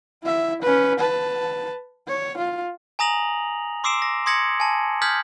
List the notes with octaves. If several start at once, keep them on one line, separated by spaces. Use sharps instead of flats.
E4 E5
C#4 B4
B4 A5
C#5
F4
G#5 A#5 D#6 A#6 F7 F#7
C6 D6 E6 C7 D7 E7
A#6
C6 D#6 G#6 A#6 C#7 F#7
G#5 A5
D#6 F6 G6 G#6 B6 F#7